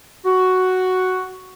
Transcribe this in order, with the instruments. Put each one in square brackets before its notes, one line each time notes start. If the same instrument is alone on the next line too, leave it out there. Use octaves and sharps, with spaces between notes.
[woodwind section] F#4